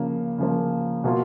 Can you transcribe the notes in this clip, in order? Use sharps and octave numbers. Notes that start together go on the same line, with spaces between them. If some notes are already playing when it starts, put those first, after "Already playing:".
Already playing: C#3 F3 A#3
C#3 F3 A#3
B2 A#3 F4